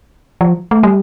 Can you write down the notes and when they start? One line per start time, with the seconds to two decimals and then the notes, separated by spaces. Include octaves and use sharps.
0.41 F3
0.71 A3
0.83 G3